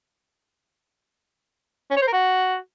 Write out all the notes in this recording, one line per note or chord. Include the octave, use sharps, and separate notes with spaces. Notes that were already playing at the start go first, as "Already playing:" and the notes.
C#4
C#5
C5
A#4
F#4